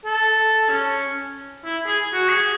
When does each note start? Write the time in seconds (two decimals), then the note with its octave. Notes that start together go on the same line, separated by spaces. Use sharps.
0.05 A4
0.70 C#4
1.65 E4
1.87 G#4
2.13 F#4
2.29 G#4